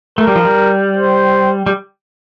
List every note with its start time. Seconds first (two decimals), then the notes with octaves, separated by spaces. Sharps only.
0.18 A3 A#4
0.27 G3
0.35 F3
0.45 G3
0.97 C5
1.66 G3